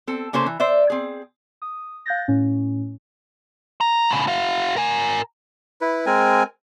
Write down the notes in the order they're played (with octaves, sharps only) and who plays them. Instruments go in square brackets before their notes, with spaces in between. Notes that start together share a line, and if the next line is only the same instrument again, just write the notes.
[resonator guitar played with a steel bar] C4 A4
C#3 A#3 C#4 A4 C5
E3
C5 D5 E5
C4 G#4
[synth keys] D#6
F5 F#6 G6 A6 A#6
A2 C#4
[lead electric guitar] A#5
A2 C#3
F#4 F5
A#4 G#5
[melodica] E4 B4
G#3 C4 A#4 G#5